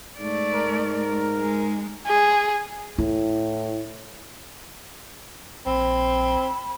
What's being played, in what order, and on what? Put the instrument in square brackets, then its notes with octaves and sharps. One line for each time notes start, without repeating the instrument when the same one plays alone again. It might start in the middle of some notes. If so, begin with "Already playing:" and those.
[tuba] G#2 [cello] A3 D5
[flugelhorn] A#4
[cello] G#3
[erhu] G#4
[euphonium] A2 [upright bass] E4
[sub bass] A#1 [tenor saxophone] C4 [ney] B5